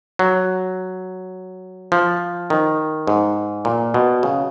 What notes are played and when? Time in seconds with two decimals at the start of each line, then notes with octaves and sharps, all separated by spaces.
0.19 F#3
1.92 F3
2.50 D#3
3.07 G#2
3.65 A#2
3.94 B2
4.23 C#3